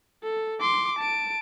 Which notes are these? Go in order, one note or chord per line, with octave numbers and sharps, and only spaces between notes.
A4
C6 D6
A5 D7